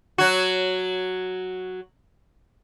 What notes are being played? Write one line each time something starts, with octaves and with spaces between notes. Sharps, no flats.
F#3 F#4